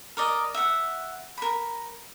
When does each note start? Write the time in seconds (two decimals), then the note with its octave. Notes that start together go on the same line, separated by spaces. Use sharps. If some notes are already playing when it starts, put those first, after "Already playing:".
0.17 A#4 D5 D#5
0.54 E5 F#5
1.37 A#4 B5